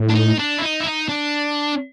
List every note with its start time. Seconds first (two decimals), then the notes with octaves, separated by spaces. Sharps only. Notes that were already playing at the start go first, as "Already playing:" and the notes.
Already playing: A2
0.09 D4
0.15 D#4
0.39 D4
0.58 E4
0.62 D#4
0.80 E4
0.86 D#4
1.09 D4